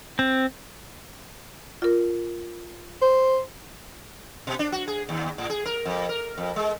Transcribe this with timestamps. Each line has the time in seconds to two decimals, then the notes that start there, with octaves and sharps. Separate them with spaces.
0.19 C4
1.82 F4 A#4
3.02 C5
4.47 B2
4.59 D4
4.72 F#4
4.88 G#4
5.09 D#2
5.38 A2
5.50 G#4
5.65 A#4
5.85 F2
6.09 A#4
6.38 F2
6.56 G#3